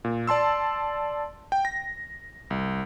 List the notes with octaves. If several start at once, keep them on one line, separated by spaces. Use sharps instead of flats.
A#2
D5 A5 C6 E6
G5
A#6
C2